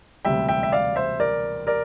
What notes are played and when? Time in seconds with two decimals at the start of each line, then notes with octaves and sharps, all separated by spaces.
0.25 E1 D2 C3 G3 E5 G5
0.49 E5 G5
0.63 E5
0.72 D5 F5
0.96 C5 E5
1.20 A#4 D5
1.67 A#4 D5